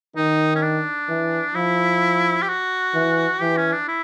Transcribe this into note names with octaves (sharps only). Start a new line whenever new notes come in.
D#3 D#4
C#4
D4
E3
F3 E4
G4
F#4
E3
E3 G4
C#4
D4
E4